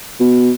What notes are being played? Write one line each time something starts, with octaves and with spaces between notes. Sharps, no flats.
B2